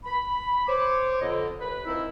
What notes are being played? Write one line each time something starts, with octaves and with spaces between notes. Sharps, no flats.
B5
C5 C#5 D6
F2 D3 D#5
D#2 B4 B5
D#3 F3 C4 D#4 E4